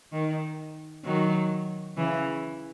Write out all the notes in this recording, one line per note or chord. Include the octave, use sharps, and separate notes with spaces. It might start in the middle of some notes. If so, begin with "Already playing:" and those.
D#3
D#3 F#3
C#3 E3